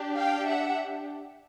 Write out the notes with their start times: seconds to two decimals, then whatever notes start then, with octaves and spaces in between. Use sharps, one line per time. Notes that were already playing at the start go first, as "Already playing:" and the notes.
Already playing: D4 G4
0.16 F5 G5
0.47 E5 F#5